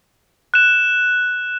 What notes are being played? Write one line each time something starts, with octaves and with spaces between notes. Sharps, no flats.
F#6 E7